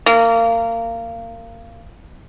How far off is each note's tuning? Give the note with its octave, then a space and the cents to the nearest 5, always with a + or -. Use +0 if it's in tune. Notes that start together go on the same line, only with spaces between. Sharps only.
A#3 -25